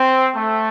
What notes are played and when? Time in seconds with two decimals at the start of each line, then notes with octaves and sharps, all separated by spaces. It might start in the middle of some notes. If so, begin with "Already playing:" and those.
Already playing: C4
0.35 A3